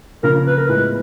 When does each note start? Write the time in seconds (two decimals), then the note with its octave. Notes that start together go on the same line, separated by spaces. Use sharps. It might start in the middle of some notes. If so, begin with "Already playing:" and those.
0.23 C#3 F3 A#3 A#4
0.47 B4
0.58 A#4
0.69 A2 F3 G#3 B3 E4 B4